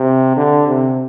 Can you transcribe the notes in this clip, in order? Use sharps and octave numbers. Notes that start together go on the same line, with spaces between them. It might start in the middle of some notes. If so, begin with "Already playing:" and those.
Already playing: C3
D3
C3